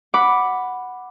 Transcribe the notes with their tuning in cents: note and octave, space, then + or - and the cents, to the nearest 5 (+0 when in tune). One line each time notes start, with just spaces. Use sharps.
F#5 +0 B5 +0 D6 +0